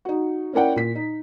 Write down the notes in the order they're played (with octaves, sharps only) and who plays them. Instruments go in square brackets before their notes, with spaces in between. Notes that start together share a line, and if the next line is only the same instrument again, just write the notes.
[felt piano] D#4 F#4
C#4 E4 A#4 D5 F#5 G5
A#2 B6
D#4